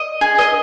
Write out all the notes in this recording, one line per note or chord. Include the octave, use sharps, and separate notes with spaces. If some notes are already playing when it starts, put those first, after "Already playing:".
Already playing: D#5
G#4
D#5